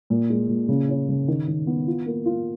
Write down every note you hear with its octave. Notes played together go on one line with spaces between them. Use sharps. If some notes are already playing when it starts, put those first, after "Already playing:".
A#2
G#3
A#2
C#3
C#4
C#3
D#3
D#3
B3
F4
A#3
F4